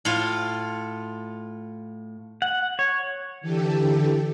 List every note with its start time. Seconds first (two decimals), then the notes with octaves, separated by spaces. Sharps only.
0.05 A2 F4
2.42 F#5
2.79 C#5
3.41 D3 E3 G4 A4